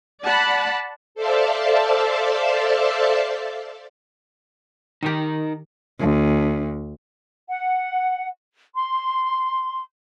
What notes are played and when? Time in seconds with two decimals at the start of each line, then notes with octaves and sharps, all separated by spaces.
0.23 D5 F#5 A5 B5
1.15 A4 C5 D5 E5 F5 A5
5.03 D#3 D#4 G4 A#4 A#5
6.00 D2
7.48 F#5
8.74 C6